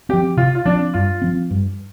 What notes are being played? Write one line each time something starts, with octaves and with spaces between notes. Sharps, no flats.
F3 C4 G4
C3 F4
F4
F3 C4 D4
G2 F4
F3 C4
G2